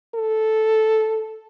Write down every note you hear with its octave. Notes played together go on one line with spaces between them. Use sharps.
A4